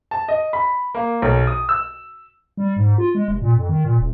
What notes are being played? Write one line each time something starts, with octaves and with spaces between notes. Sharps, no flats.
A5
D#5
B5
A#3
B1
D#6
E6
G3
G#2
F4
G#3
F1
A#2
F2
D#3
A#2
D#1